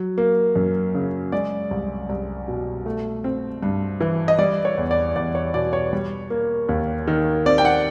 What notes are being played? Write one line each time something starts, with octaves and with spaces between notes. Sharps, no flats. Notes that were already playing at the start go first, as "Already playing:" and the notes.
Already playing: F#3
A#3
F#2
C#3
G#3 D5
C2
C2
B2
A3
C4
G2
E3
D#5
G3 D5
C#5
E2
D5
E2 D5
C#5
B2 D5
C#5
G3
A#3
D#2
D#3
C4 D5
G5
F#5